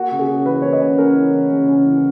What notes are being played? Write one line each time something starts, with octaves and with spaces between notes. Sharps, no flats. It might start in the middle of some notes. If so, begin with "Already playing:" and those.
Already playing: A#3 F#4
C#3
G#4
C#4
E3 B4
A#3 C#5
D#5
C#3
C#4 A#4
E3
A#3
C#3
C#4
E3